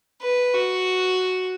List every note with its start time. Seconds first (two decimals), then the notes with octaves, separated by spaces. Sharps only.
0.22 B4
0.54 F#4